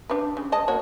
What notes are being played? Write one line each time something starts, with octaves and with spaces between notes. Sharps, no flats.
D4 G4 B4
C#3
G#3 D#5 A5
A#3 F#4 C#5